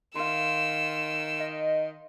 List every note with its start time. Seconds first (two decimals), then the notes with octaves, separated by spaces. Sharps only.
0.15 D#3 F5 C6 E6
1.40 D#5